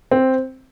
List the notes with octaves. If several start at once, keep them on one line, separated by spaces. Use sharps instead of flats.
C4